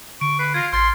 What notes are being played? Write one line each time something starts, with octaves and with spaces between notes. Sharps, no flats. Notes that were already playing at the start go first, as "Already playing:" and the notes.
D3 C#6 D7
B4 C7
F4 G#6 A#6
A1 C6 F6 G#6 A6